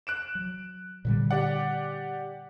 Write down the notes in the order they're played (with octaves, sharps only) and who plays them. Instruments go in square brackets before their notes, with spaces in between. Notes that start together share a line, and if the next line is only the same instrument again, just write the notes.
[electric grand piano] F#6 D7 E7
[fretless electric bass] F#3
A#2 D3 G3
[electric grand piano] G4 D5 F#5